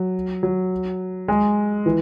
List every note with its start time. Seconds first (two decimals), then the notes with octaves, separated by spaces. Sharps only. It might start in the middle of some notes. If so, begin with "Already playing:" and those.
Already playing: F#3
0.43 F#3
1.28 G#3
1.86 E3